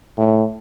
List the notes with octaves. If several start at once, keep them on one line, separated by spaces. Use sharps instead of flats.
A2